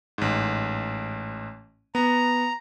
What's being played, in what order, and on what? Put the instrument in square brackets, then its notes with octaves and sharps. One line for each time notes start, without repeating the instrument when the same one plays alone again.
[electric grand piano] A1 G#2
[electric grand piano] B3 [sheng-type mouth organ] A#5